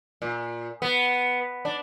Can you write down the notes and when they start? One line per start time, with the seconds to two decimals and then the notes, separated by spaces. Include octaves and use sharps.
0.22 A#2
0.82 B3
1.65 D4